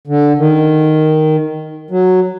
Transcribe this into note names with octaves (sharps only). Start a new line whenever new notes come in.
D3
D#3
F#3